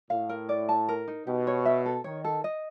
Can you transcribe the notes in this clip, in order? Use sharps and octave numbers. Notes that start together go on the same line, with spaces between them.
A2 F5
A#4
D5
A5
A#4
D#4
B2 G4
C#5
E5
A4
D#3 C#5
A4
D#5